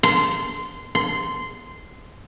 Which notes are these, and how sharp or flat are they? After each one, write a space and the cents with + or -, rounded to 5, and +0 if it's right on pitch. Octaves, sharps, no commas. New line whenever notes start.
C6 -20
C6 -15